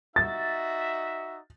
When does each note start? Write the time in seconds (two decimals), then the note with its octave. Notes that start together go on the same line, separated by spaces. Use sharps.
0.16 D#4 F#4 E5 A6